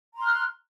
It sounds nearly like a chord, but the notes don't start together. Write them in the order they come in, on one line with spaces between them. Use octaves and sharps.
A#5 C6 F6 F#6